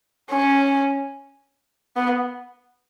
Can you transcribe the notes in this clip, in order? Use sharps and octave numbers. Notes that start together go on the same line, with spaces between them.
C#4
B3